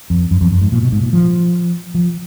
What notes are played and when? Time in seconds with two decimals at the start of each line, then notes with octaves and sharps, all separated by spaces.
0.10 F2
0.31 F#2
0.41 F2
0.52 F#2
0.62 G#2
0.72 A#2
0.82 B2
0.92 G#2
1.03 A#2
1.13 F3
1.95 F3